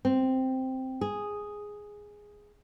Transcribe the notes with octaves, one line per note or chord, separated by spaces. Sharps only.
C4
G#4